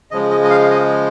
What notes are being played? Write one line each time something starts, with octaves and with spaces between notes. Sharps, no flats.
C#3 F3 G#3 D#5
D#5
D#5
F5
D#5